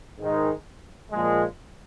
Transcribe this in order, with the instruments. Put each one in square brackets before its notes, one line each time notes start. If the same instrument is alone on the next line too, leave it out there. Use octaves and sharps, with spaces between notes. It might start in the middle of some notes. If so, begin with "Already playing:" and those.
[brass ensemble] G#2 D#3 G#3 D#4
A#2 F3 G#3